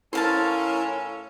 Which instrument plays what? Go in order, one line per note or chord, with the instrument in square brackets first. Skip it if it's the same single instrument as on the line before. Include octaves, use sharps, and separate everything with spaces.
[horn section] A2 C#4 [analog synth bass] E4 [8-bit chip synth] A4 A#4 [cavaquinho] C5 F5 A5